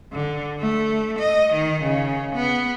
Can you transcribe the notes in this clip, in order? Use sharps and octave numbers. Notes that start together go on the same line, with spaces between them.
D3
A3
D#5
D#3
C#3
B3